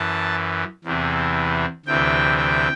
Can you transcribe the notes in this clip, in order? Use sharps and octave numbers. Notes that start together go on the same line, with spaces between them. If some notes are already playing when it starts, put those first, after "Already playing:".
Already playing: F#2 E3 A5
E2 C3 E3
D2 C3 E3 G5
G5